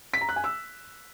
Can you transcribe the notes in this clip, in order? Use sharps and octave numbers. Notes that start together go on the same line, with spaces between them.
B6
A#5
F#6
G#5
E6